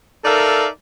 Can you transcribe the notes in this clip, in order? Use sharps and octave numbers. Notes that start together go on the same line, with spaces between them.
D#4 A4 A#4 D5 E5 F5